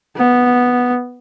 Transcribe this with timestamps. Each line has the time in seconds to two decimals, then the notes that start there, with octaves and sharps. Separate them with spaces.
0.17 B3